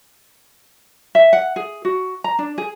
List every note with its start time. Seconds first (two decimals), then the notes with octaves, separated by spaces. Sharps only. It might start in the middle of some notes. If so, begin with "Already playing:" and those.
1.15 E5
1.33 F#5
1.56 G#4
1.85 F#4
2.24 A#5
2.39 D4
2.58 G#4